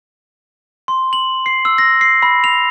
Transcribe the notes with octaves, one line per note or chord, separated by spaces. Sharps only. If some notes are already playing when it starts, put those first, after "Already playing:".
C6
F#7
C7
E6
A#6
C7
B5
F7